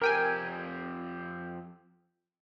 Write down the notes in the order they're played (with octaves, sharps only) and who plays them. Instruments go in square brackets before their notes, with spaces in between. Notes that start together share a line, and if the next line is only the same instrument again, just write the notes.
[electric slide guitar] F2 C4 G4 [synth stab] A#4 G5 G#5